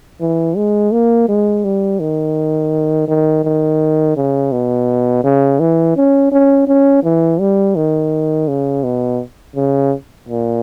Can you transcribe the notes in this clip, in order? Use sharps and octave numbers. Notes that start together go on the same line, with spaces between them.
E3
G#3
A#3
G#3
G3
D#3
D#3
D#3
C#3
B2
C#3
E3
C#4
C#4
C#4
E3
G3
D#3
C#3
B2
C#3
A#2